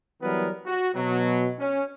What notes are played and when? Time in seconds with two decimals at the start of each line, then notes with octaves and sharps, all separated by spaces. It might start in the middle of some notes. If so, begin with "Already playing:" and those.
0.22 E3 F#3 G3 B3 A#4 B4
0.66 F#4
0.95 B2 F#3
1.59 C#4